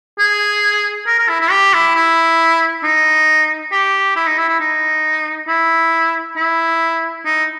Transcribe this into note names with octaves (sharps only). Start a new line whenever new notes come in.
G#4
A#4
A#4
E4
E4
G4
E4
E4
D#4
G4
E4
D#4
E4
E4
D#4
E4
E4
D#4